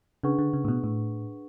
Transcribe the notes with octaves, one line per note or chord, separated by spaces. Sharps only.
C#3 D4 G#4 B4 F#5 C#6
D3
C#3
A2
B2
A2